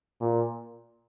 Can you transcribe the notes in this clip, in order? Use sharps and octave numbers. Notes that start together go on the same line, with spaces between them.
A#2